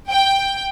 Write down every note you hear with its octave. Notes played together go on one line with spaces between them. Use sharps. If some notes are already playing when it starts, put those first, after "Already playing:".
G5